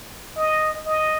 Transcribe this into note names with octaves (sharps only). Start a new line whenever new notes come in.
D#5
D#5